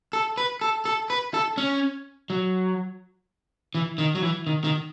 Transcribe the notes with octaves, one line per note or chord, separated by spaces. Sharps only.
A4
B4
A4
A4
B4
A4
C#4
F#3
E3
D#3
F#3
E3
D#3
D#3